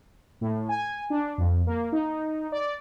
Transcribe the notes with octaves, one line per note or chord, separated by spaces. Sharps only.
A2
G#5
D4
F2
A#3
D#4
D5